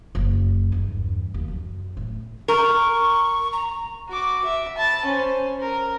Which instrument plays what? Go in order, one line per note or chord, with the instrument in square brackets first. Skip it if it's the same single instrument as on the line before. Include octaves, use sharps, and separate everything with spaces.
[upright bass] F#1
E2 G2
D#2
F#2
A2
[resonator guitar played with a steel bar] A#4 [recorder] C#6
[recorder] A#5
[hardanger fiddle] F#4 D6
E5
A5 B5
C#4 C5
A#4